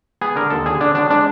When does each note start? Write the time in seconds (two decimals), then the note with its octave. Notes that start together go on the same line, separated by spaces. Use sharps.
0.21 B3 G#4
0.36 D3 A#4
0.50 D#2 A4
0.66 D3 G#4
0.80 D3 D4
0.95 F#3 D4
1.10 G#3 D4